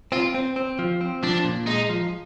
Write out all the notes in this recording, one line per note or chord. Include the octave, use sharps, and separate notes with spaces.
C4 F4
C4
C4
F3
C4
F3 D4
A#2
G#3 D#4
F3